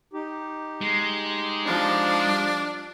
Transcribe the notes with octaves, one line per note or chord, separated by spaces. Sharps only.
D#4 G4
G#3
F3 D4